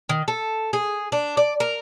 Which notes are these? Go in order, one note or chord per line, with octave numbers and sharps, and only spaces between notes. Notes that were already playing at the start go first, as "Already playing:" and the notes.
D#3
A4
G#4
D4
D5
A#4